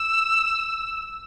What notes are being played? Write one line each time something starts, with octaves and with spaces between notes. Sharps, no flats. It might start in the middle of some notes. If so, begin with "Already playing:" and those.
Already playing: E6